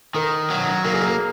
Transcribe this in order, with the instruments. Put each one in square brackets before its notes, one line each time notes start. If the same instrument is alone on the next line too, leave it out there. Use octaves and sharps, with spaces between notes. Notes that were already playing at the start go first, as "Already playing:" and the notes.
[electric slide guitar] D#3 [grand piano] A#4
[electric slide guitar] F#3
[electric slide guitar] A#3 [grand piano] A#4
[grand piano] G#4
A#4